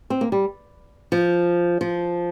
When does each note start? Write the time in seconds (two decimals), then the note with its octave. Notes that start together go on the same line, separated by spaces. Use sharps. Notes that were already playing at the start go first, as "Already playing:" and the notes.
0.10 C4
0.21 A#3
0.32 G3
1.12 F3
1.81 F3